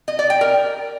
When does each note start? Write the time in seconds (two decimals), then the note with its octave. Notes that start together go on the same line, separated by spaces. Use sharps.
0.08 D#5
0.19 D5
0.30 G5
0.41 A#4